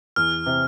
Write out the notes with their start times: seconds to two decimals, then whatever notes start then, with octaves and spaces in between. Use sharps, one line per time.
0.16 E2 F6
0.46 C3